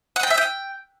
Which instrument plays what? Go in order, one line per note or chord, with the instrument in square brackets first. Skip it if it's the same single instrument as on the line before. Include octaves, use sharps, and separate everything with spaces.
[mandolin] F#5
G5
E5
G5